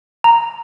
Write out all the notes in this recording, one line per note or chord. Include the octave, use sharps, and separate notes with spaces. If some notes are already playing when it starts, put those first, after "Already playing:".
A#5